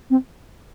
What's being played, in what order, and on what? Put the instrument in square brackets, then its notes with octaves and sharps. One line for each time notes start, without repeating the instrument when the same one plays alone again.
[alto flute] C4